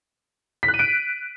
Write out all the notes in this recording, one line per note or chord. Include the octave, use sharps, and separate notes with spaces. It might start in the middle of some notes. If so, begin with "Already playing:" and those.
B6
F#6
D#7
D7